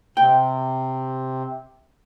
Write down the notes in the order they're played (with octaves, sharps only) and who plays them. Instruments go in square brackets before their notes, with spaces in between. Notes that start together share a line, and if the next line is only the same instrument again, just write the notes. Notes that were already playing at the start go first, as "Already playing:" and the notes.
[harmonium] C3 [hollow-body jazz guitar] G5